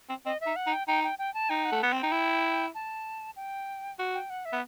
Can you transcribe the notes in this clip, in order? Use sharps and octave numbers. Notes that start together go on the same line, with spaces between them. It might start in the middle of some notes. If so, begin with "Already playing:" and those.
C4
C4 D#5
E5
D#4
F#5
D#4
G5
D#4 G5
G5
G5
A5
D#4 G5
F#5
A3
B3
C4 G5
D#4
E4
A5
G5
F#4
G5
F#5
E5
B3